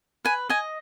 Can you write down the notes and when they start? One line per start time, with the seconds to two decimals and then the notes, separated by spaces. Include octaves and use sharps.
0.25 B4 G#5
0.50 D#5 G#5